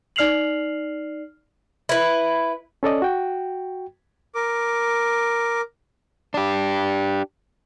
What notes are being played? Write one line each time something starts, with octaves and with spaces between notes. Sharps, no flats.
D#4 D5 F6 C7 F7 F#7
E4 B4
C#4 A4 D5 D#5
F#4 G5
A#4 D6
D4 G4